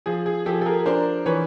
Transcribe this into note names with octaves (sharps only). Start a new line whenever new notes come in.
F3 G#4
G#4
F3 G4 A4
A4
G#4 A#4
D4 A#4 C5
E3 B4 C#5